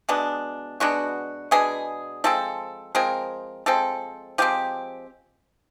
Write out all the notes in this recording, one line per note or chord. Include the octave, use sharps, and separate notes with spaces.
B2 G#3 B3 D4
B2 G#3 B3 D4 F#4
B2 G#3 B3 D4 G#4
F3 G#3 C4 A4
F3 G#3 C4 A#4
F3 G#3 C4 A4
F3 G#3 C4 G4